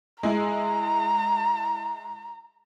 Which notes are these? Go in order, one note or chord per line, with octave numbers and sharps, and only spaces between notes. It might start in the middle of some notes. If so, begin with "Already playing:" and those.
G#3 E4 G#4 A#5